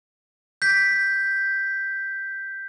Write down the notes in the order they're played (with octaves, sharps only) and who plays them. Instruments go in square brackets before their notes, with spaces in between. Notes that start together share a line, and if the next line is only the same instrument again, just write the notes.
[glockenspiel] G6 B6